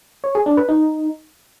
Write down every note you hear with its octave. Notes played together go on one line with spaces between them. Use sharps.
C#5
G#4
D4
B4
D#4